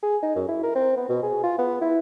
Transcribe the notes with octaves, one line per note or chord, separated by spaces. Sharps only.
G#4
D#4
F#2
E4
A#4
C4
B3
B2
G#4
F4
B3
E4